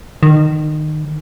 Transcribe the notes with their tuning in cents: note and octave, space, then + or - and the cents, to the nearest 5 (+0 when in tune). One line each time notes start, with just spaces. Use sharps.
D#3 -25